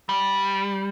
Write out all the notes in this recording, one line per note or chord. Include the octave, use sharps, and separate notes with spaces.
G3